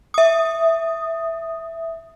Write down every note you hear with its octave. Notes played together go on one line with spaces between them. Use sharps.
E5 D#6